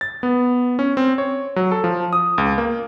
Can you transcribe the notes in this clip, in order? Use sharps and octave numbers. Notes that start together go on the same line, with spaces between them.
A6
B3
C#4
C4
C#5
F#3
A4
F3
D#6
C#2
A#3